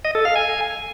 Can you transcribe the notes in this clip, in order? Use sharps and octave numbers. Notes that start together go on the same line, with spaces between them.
D#5
A4
F5
G#5